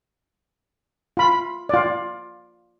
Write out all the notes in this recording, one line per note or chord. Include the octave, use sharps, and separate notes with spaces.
F4 B5
F4 D5